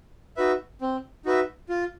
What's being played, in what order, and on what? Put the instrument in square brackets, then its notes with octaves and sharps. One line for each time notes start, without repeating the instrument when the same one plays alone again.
[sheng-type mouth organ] D#4 F#4 B4 E5
C4
D#4 F#4 B4 E5
F4